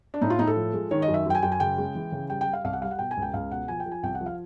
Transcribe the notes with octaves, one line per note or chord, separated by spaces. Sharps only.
D4
A2 D#4
F4
A2 D#4
A4
F3
G#3
D#3 C#5
D#5
F#2
E5
F#2 G5
G#5
F#2 G5
G#5
C#3 G5
G#3
E3
C#3
G3 G5
G5
G3
F5
C2 F5
F#5
G3 F5
F#5
B2 G5
G#5
C#2
G5
C#2 F5
B2 F#5
F3 G#5
G5
F3
G#5
C2 G5
F#5
F3
F5